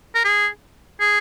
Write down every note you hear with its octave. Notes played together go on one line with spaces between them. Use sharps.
A#4
G#4
G#4